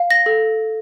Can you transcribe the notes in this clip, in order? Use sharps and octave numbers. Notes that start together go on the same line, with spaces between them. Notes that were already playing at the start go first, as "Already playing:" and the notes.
Already playing: F5
A#6
A4